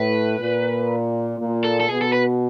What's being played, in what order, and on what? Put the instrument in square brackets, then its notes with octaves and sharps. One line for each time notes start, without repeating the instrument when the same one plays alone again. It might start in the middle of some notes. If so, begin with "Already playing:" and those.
Already playing: [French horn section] A2 [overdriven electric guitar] B4
[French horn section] A#2
A#2
[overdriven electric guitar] A4
A4
[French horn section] B2 [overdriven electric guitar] G#4
[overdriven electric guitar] A4
B4